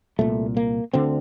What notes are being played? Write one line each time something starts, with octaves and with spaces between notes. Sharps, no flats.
C2 A#2 A3
A#3
D2 D3 C4